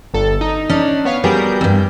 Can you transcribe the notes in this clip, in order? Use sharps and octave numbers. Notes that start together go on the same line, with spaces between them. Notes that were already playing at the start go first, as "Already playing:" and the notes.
G1 A4
D#4
C#4 D4
B3 C#5 F5
G3 B3 F#4 G#4 A#4 G6
E2 G2